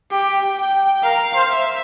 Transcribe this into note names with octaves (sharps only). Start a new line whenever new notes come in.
G4 G5
G5
A#4 F5
C5
E5